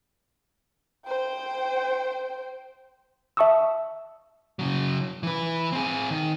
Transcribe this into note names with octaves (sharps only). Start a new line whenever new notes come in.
C5 G5
E5 A5 C#6 D#6 E6
C#3 F#3
E3 B4
C4 G#4
D#3